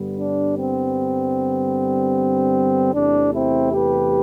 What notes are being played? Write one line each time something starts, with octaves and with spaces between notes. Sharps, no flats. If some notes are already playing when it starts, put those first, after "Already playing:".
Already playing: G2 D3 G3 B3
D4
C4
E2 C3 E3 A3 C4 D4
C4 E4
G4 B4